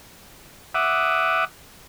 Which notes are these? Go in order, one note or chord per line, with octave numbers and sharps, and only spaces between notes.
E5 F#5 D6 D#6